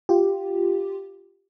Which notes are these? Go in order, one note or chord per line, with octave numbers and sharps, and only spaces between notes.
F4 G4